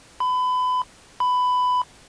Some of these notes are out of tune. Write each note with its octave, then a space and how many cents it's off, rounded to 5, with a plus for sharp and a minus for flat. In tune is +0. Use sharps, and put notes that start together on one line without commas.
B5 +30
B5 +15